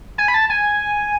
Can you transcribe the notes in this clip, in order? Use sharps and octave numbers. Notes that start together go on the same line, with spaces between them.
G#5
B5
A5
G#5